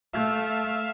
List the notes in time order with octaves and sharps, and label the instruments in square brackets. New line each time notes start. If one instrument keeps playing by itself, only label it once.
[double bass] A3 [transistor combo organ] E5 F5